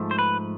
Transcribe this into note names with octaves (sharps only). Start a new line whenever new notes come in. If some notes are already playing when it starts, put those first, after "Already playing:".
Already playing: G#2 F3 A3
C5
B4